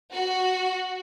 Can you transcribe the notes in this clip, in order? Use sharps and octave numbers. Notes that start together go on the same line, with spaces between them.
F#4